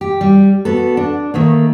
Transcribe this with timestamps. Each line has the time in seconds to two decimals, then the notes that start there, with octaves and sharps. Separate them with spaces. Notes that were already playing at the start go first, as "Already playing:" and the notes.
0.01 G4
0.21 G3
0.65 B3 F#4 A4
0.97 D4
1.34 D#3 A3 A#3